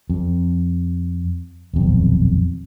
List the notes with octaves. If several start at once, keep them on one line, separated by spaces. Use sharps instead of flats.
F2
D#1 B1 F2